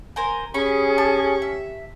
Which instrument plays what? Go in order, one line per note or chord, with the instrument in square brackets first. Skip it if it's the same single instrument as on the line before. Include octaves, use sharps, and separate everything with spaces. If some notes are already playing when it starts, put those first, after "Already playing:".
[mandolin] A#4 C5 G#5
[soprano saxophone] C#4 [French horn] G4 [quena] G#4 [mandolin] B5
[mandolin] A5
E5